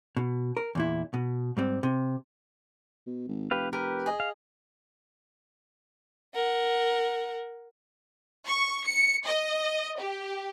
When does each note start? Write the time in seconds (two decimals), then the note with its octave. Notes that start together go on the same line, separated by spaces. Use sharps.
0.17 B2
0.57 A#4
0.75 E2 A#2 E4
1.14 B2
1.57 G#2 G3 C4
1.83 C3
3.07 B2
3.28 G#1
3.51 F1 G4 B4 F5
3.73 G4 A#4 B4
4.06 G#4 D#5
4.20 F5
6.35 A#4 F#5
8.48 C#6
8.86 C#7
9.26 D#5
9.98 G4